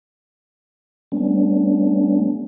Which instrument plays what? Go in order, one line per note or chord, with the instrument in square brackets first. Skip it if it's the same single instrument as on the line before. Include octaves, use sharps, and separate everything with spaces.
[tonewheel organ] G3 A3 B3 C#4 D4